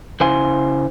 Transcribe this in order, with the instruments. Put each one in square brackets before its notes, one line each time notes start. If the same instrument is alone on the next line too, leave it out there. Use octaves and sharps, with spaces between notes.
[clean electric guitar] C#3 E4 C5 F5 G#5 C6